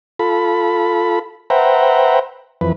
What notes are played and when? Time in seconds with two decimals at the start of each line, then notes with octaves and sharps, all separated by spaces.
0.19 F4 A4 B5
1.50 B4 C5 E5 F#5 G5 A#5
2.61 F2 E3 B4